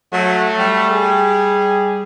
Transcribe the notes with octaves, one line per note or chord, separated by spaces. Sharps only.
F#3 A3
G3
G#4